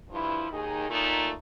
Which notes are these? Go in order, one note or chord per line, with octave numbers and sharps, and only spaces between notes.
G2 F3 E4
D#2 D#3 D#4 G#4
A#2 A3 D#4